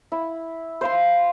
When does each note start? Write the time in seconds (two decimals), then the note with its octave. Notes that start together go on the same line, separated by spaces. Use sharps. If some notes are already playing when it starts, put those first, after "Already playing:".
0.12 E4
0.81 C5 F5 C6